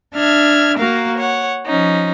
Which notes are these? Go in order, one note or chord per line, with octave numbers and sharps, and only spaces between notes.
D4 E5 F6 G#6
A#3 F#4 A#4 F5
C#5 F#5
F3 C#4 D#4